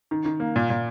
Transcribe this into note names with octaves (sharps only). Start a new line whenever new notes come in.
D#3
D#3
A#3
A#2
A#2